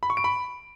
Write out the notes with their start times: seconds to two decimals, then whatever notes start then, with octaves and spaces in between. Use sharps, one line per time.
0.03 B5
0.10 C#6
0.17 D7
0.24 B5